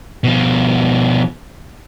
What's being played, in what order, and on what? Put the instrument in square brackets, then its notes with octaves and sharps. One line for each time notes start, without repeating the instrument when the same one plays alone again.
[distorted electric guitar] B2 F3